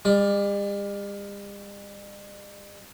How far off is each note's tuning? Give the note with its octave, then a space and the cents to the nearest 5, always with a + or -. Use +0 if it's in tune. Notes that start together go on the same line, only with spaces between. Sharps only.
G3 +45 D5 +0